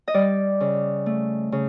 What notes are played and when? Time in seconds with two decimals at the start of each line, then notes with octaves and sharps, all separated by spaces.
0.08 D#5
0.14 G3 D5
0.60 C#3
1.06 A3
1.52 C#3